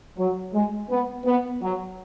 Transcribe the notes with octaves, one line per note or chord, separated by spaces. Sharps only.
F#3
G#3
B3
B3
F#3